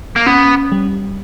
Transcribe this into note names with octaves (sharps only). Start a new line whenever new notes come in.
A#3
B3 C#4
G3